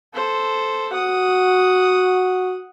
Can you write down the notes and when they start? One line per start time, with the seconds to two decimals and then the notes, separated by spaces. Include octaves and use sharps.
0.13 A4 C5
0.93 F#4 F#5 D#6